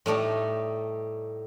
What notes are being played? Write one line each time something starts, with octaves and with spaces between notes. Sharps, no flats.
A2 G3 A3 D#4